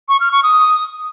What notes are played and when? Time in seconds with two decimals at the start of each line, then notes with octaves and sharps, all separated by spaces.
0.09 C#6
0.20 F6
0.32 C#6
0.43 D#6